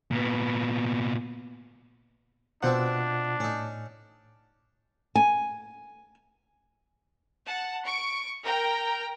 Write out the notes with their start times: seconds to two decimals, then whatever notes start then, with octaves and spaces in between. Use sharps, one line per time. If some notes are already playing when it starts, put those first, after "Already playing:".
0.11 A#2 B3
2.63 B2 C4 D4 E4 F4 C5 F#5
3.40 A2 C#4 D#4
5.15 G#5
7.45 F#5 A5
7.85 C#6 D7
8.44 A#4 G5 A#5